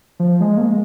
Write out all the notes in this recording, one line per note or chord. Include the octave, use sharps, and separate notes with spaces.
F3
G#3
A#3
G#3